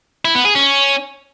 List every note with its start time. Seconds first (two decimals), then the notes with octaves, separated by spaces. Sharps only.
0.25 E4
0.35 B3
0.45 G#4
0.55 C#4